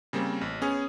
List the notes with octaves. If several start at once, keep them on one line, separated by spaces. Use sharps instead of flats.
C#3 G3 A#3 C4
A1
B3 C#4 G#4